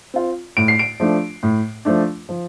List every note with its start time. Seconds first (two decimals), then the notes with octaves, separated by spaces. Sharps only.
0.14 C4 F4
0.57 A2 D7
0.68 C7
0.79 D7
1.00 F3 A3 D4
1.43 A2
1.85 F3 A3 D4
2.29 F3